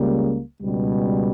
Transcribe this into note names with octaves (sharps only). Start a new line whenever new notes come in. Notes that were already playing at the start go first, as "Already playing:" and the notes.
Already playing: C#2 C#3 G3 A#3
C#2 B2 G3